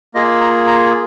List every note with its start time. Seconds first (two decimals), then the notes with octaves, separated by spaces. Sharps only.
0.14 A#3 F4 G#4 D#5
0.41 A#5
0.67 A#5